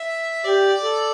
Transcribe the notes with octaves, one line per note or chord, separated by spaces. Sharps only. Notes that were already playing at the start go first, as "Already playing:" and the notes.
Already playing: E5
G4 D5
A4